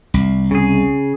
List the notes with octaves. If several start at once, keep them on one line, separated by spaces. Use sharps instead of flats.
C2
C#3 G#4